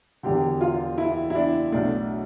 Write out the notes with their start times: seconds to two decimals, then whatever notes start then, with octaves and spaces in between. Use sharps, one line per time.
0.23 E1 E2 D3 G4
0.61 F4
0.98 E4
1.30 E4
1.35 D4
1.72 B1 B2 A3 D4